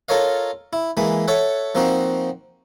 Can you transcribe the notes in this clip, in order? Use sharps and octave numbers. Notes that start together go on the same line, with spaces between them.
F4 A4 A#4 C#5 D#5 F5
E4
E3 G#3 A#3 B5 D#6
A4 C#5 E5 F#5
F3 A#3 C4 D#4 F#4